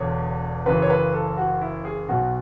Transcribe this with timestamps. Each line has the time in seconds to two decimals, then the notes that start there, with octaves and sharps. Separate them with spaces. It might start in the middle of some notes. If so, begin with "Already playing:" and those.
Already playing: E1 E2 D3 C#5
0.66 F#1 F#2 C#3 E3 B4
0.82 C#5
0.90 B4
1.14 A4
1.38 F#4
1.61 E4
1.85 G#4
2.09 B1 B2 F#3 F#4